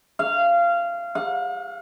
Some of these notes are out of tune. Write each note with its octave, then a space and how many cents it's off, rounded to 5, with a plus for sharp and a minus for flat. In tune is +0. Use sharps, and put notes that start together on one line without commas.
F5 -20
F5 +45